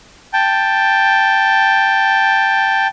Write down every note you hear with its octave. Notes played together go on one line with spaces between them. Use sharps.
G5 A5